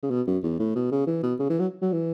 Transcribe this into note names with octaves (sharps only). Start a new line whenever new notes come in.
C#3
B2
F#2
E2
A2
B2
C#3
E3
B2
C#3
E3
F#3
F#3
E3